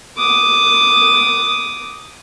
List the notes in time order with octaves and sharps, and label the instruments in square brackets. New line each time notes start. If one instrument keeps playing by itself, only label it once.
[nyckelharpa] D6 D#6